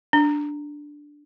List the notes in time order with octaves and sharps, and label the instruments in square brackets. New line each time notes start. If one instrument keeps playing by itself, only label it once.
[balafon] D4